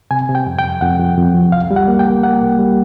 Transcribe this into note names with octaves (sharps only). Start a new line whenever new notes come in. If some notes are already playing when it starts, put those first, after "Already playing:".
C3 G#5
C3
G5
F2
G5
F2
F2 F#5
F2
F2
F3
C2 F5
G3
F#5
A#3
G5
A#3
A#3 F#5
C2
G3